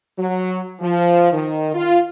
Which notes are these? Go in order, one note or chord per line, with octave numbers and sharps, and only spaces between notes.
F#3
F3
D#3
F4